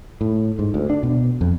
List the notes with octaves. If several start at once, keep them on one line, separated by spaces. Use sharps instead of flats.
A2
G#2
D2
D4
B2
F2